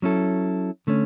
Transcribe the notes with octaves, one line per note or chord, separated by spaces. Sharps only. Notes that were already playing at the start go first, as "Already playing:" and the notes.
F#3 C#4 E4 A4
D3 A3 C#4